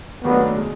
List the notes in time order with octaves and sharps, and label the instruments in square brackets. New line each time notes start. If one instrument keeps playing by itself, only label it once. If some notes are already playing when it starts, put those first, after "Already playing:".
[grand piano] D#2 D#3 F#3 A3 D4 [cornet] B3
[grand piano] B2 G#3